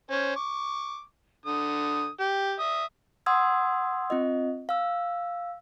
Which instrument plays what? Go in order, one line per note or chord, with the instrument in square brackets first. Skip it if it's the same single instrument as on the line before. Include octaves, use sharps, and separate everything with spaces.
[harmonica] C#4 C5
C#6 D6
D3 D#6
G4
E5 D#6
[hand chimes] F#5 C6 D#6 E6 G#6
C4 F4 D#5
F5 E6